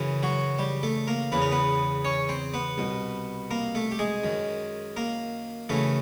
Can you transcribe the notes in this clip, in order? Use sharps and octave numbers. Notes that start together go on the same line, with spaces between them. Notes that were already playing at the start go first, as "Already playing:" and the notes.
Already playing: F#2 C#3 E3
F#3 F#4
G3 G4
A3 A4
A#3 A#4
E2 C#3 E3 B4
A#4
B3 B4
C#4 C#5
C4 C5
B3 B4
C2 B2
A#3 A#4
A3 A4
G4
G#3 G#4
F#2 D#3
A#3 A#4
F#2 C#3 E3 A3 A4